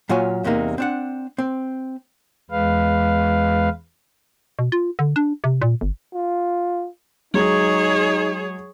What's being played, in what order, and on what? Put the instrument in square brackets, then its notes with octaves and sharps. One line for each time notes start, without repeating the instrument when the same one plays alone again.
[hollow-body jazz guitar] A#2 F#3 F4 C#5 G#5
E2 C3 G#3 A#3 D#4
C4 D4 F#5
C4
[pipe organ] E2 G#3 B4 F5
[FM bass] B2
F4
D3
D4
C3
A#2
G1
[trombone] F4
[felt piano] F#3 G#3 [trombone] D#4 [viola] G#4 C#5